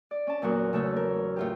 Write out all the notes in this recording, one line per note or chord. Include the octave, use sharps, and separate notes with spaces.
D5
C#4 A5
E2 A#2 F#3 F#4 A#4
C#3 A3 A4 C#5
A#4
A2 F4 G4